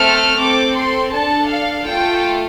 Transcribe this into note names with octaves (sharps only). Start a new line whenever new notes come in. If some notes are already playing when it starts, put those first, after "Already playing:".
Already playing: A3 C4 A4 F6
C4 A4 D6
C6
D4 A4 A5
F5
A3 F4 A4 G5